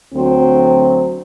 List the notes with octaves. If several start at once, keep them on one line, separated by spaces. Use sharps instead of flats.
D2 F#3 C4